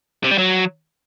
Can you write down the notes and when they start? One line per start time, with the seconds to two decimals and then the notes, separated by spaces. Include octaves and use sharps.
0.24 C3
0.31 G3
0.38 F#3